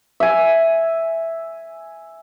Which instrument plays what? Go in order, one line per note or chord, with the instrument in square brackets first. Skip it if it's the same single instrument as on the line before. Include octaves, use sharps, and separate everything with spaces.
[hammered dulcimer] E5 G#5